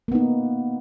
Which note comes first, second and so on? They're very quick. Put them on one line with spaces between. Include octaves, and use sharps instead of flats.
A#3 B3 D#4